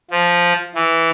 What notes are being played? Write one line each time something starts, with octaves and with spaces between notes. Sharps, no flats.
F3
E3